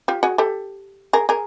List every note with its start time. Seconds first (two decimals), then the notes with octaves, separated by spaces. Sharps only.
0.08 F4 G4
0.23 F#4 G#4
0.38 G4 A4
1.13 G#4 A#4
1.29 G#4 A#4